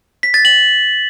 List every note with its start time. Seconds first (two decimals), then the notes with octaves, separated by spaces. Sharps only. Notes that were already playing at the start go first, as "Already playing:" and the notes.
0.23 B6
0.34 A6
0.45 F#7